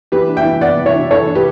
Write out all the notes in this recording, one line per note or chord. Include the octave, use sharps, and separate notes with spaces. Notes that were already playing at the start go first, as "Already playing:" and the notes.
E3 G4 B4
D4
E5 G5
E3
B3 D5 F#5
E3
C#5 E5
D4
E3 A4 C#5
D4
G4 B4